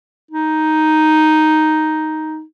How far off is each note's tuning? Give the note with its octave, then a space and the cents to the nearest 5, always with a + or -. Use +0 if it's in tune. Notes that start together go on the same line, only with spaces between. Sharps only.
D#4 +0